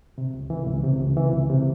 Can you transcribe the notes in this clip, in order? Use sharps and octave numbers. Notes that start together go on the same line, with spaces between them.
C3
C#2
E3
C#2
C3
C#2
E3
C#2
C3